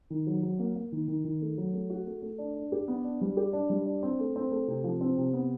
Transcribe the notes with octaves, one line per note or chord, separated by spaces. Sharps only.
D#3
F#3
F#3
A#3
A#3
D#3
D#3
D#3
A3
F#3
A3
F#4
A3
A3
D4
D4
G4
B3
D4
G3
G4
D4
G3
D4
C4
A3
C4
A3
C3
F3
C4
C3
B3